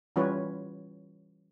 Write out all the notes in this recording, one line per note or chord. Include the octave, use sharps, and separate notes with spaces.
E3 G3 C#4 F4 B4 C#5